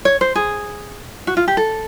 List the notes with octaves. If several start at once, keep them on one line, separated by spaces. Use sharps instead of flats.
C#5
C5
G#4
F#4
F4
G4
A4